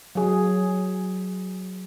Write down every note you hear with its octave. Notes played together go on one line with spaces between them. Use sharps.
F#3 G#4